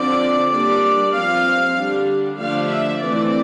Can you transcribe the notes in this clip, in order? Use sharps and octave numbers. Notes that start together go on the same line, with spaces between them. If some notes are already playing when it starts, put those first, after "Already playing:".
Already playing: D3 F3 C4 D5
G3 A#3 D4 D5
F3 C4 F5
D3 G3 D4
D3 F3 A3 D4 F5
E5
E3 A3 C4 D5